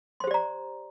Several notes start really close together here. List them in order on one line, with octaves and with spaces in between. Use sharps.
C6 C5 G4 D5 A#5